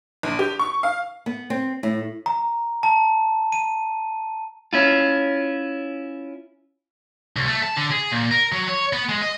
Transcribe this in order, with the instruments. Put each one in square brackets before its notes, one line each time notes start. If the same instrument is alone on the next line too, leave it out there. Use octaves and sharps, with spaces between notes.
[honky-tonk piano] A#1
G4
C#6
F5
[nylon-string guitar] B3
C4
A2
[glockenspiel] A#5
A5
D#7
[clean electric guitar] C#4 E4 F4
[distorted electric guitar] C2
A3
A5
D3
G#4
A#2
A#4
F#3
C#5
B3
G#3
D#5